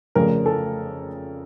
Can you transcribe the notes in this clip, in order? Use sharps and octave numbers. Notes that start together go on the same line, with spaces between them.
F1 F2 C#3 A#4
A4